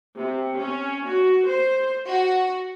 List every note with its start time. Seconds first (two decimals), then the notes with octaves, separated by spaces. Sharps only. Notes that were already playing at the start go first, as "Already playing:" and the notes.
0.17 C3
0.58 C#4
1.06 F#4
1.47 C5
2.07 F#4